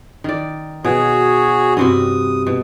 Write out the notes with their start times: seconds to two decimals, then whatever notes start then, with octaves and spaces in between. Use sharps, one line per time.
0.24 D#3 D5
0.84 B2 F#4 G#4 C#5
1.77 G2 C3 F#4 D#6
2.47 B2